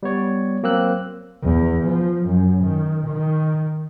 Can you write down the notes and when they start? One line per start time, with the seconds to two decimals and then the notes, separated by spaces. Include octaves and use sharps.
0.03 G3 B3 C#5 D5
0.63 F#3 A#3 C4 E6 F#6
1.43 E2
1.86 F3
2.26 F#2
2.64 D#3
3.07 D#3